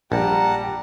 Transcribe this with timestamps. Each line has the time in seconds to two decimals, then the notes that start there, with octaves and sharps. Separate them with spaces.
0.12 A#1 G3 F#5 A5 A#5